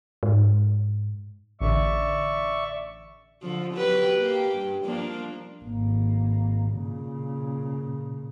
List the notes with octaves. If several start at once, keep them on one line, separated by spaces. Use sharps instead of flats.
G#2
A1 D3 D5 E5 C#6
D3 F3
F#3 G4 B4
A#3 G4
G2
F3 A#3 D4
G#1 A#3
A#2 C#3